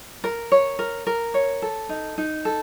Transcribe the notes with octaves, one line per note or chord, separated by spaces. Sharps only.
A#4
C#5
A#4
A#4
C#5
A4
D#4
D#4
A4